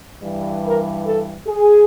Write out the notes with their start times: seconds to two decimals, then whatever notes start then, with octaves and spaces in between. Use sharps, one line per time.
0.23 G2 E3 G3
0.64 A#4
1.06 A4
1.47 G#4